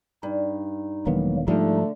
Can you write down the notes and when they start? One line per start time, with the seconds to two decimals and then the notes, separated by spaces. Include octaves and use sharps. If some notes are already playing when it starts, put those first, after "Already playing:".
0.23 G2 D#4
1.07 E1 D#3 F#3 G3 A#3 B3
1.48 G#2 D3 F3 G3 A3 D#4